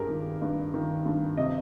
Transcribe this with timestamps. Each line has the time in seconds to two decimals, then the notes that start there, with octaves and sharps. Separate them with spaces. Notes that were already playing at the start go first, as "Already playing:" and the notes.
Already playing: G2 G#3 G4 G#4 A#4
0.08 D#3
0.42 G2
0.74 D#3
1.06 G2
1.37 C3 D#5